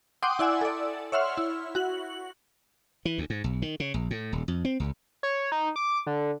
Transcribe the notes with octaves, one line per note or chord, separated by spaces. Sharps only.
F#5 G5 C6 D6 D#6
E4 D5 F#5 G#5 E6
A4 D5
C#5 E5 F#5 C6 F6
E4
F#4 F#7
E3
D2
G#2
B1
D#3
C#3
A#1
A2
D#1
F2
C4
C#2
C#5
D#4
D6
D3